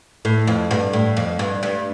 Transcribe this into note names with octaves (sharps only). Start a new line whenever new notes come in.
A2
F2
G2
A2
F2
G2
G2